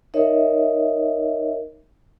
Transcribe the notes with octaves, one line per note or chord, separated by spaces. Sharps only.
D#4 A#4 C#5 D#5 E5